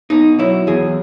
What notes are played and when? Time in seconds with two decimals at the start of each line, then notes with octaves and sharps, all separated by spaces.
0.10 B2 D#4
0.39 F#3 E4
0.67 E2 G#4